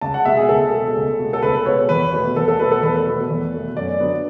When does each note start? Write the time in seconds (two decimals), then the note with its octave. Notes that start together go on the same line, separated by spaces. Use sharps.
0.01 C#2 A5
0.14 F#5
0.25 B2 G#3 E5
0.37 G#4
0.49 C#2 A4
0.72 B2 G#3
0.95 C#2
1.19 B2 G#3
1.33 A4
1.42 C#2 B4
1.66 B2 G#3 C#5
1.89 E2 B4
2.13 B2 A3
2.36 E2 A4
2.48 A4
2.59 B2 A3 B4
2.72 A4
2.83 E2 B4
3.06 B2 A3
3.30 E2
3.54 B2 A3
3.77 F#2 D5
4.00 D3 F#3 B3